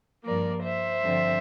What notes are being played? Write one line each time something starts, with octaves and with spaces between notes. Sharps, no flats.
G2 F3 A#3 A#4 D5
C5 E5
G2 D3 F3 C4